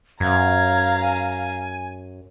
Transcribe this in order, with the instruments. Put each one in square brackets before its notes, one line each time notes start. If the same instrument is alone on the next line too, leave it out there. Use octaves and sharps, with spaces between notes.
[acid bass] F#2 [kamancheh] F5 A#5 [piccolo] G#6
[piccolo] G#5